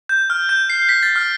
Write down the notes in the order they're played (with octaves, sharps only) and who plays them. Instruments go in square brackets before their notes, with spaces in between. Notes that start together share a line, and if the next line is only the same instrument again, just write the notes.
[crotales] G6
F6
G6
C7
B6
A6
F6